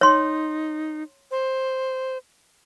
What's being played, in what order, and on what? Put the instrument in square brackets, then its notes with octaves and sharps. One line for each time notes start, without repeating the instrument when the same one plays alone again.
[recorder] D#4 [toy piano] C#5 C6
[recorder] C5